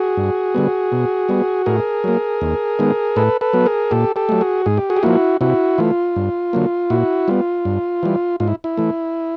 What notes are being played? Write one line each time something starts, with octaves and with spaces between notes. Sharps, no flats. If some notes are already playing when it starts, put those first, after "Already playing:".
Already playing: F#4 G#4
G2
D3 G3 B3
B2
G3 B3
A2 G#4 A#4
F#3 A#3
D#2
D#3 G#3 B3
A2 A4 B4
A4 B4
F#3 B3
G#4 A#4
A#2 G4 A4
G4 A4
F#3 A3
F#4 G#4
G#2 G#4
G4
F#4 G#4
G4
F3 A#3 E4 F#4
C3 E4 F#4
E3 A3 F4
G2
D3 F#3 A#3
A#2 E4 F#4
G3 B3 F4
G2
E3 G3
G#2 F4
E4
E4
E3 A3